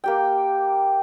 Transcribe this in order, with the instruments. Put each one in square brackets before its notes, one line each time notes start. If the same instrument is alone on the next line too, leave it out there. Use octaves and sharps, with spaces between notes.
[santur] A#3 G4 G5